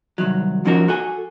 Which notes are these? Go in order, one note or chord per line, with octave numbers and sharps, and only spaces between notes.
C2 D#3 F#3
G#2 F3 C#4 D#4 F#4 A#4
F#4 A4 G#5